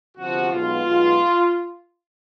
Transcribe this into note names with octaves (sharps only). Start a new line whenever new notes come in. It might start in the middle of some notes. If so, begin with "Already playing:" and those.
G1 F2 C3 F3 F#4
B1 B2 G#3 B3 F4
B1 B2 G#3 B3